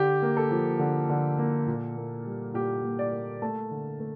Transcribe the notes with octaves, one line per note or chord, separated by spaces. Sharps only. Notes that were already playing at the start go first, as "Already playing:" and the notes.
Already playing: D3 G4
A#3
A4
F3
D3
D3
A#3
A#2
A#3
G3
A#2 G4
A#2
D5
A#3
A3 A5
D3
A3